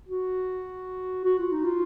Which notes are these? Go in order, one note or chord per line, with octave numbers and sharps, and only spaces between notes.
F#4
F#4
F4
D#4
F4